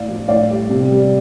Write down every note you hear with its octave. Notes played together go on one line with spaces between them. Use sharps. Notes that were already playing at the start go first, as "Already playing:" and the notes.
Already playing: A2 D5 F5
F3
A2 D5 F5
G3
C3
G3